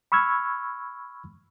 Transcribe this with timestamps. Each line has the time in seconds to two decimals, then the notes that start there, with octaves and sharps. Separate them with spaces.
0.12 B5 C#6 E6 F6 G#6